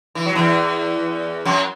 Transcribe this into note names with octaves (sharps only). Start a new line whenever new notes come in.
E3
F#3
E2 E3
F#2 F#3